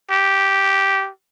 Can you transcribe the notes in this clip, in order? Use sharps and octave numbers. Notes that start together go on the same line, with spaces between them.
G4